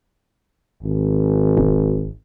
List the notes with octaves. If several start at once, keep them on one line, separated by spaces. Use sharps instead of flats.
G#1
E1